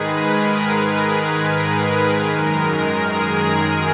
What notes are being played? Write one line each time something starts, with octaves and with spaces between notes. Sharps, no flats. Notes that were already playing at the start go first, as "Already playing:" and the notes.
Already playing: G#2 D#3 G#3 G#4 B4
A#4
F#2 D#3 G#3 A#4
A#4
G#4